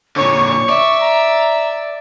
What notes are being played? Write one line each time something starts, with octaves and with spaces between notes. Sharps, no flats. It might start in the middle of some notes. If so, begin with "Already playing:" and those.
A#2 D3 C#5 C#6
D5 E5
A#5